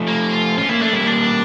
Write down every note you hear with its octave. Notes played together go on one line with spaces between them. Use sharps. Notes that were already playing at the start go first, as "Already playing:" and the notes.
Already playing: F3 A3
A#3
F4
C#4 F4
A#3 E4
A3 D4
G3 A#3 E4
D4